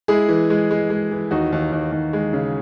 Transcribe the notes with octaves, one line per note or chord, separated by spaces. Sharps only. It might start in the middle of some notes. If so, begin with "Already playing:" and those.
G#3 E4 G#4
E3
G#3
G#3
G#3
E3
D#2 D#4 F#4
D#2
D#2
D#2
G#3
C#3